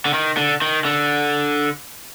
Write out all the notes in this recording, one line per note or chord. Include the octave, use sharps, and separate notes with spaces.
D3
D#3
D3
D#3
D3